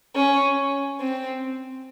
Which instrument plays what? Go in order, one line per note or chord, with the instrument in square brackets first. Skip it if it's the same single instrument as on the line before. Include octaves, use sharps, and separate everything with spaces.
[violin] C#4
C4